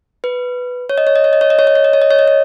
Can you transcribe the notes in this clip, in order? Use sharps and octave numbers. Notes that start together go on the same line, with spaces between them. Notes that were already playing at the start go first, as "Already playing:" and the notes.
B4
C#5
D#5
C#5
D#5
C#5
D#5
C#5
D#5
C#5
D#5
C#5
D#5
C#5
D#5
C#5
D#5
C#5